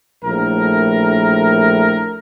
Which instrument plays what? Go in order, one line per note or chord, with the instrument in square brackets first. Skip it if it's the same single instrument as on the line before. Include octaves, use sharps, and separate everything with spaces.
[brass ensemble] A#1 A2 A3 A#4